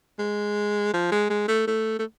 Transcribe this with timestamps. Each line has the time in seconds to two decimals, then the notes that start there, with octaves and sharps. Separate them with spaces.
0.19 G#3
0.94 F3
1.12 G#3
1.30 G#3
1.48 A3
1.68 A3
1.99 A3